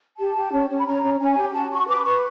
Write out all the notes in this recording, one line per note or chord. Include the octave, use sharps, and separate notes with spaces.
G4 A5
G4
C#4
C#4
B5
C#4 A#5
C#4
C#4 G#5
G4
F#4 A5
F#4 C#6
B4 D6
B4 C#6